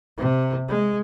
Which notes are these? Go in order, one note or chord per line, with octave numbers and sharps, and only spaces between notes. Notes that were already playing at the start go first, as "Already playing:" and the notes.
C3
G#3